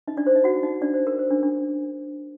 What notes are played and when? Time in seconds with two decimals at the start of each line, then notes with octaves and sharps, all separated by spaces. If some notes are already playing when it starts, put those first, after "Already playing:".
0.08 D#4 D#5
0.17 D4 D5
0.27 C5
0.35 D#4 D#5
0.44 F#4 F#5
0.63 D#4 D#5
0.81 D4 D5
0.94 C5
1.07 A#4
1.19 C5
1.31 D4
1.43 D4